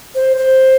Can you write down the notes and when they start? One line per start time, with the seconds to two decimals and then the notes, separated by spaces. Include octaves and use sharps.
0.15 C5
0.37 C5